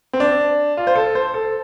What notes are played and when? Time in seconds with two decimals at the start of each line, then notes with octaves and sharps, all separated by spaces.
0.13 C4
0.20 D4
0.77 F4
0.87 C5
0.96 A4
1.15 C5
1.34 A4